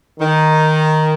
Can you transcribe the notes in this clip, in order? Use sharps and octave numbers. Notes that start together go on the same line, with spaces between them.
D#3